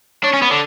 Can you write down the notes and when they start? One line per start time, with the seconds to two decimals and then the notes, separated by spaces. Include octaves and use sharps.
0.24 D4 C#5
0.33 C#4
0.42 B3
0.51 D3